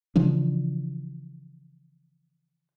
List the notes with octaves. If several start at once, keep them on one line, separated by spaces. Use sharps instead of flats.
C#3 E3 F3 D4